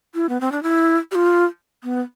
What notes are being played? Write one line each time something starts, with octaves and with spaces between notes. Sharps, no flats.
E4
B3
C4
D4
E4
G4
F4
B3